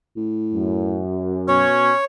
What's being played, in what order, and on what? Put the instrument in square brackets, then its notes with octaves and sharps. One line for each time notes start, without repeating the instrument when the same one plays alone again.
[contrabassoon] A2
[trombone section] F#2
[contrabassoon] B2 [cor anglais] C#4 [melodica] C#5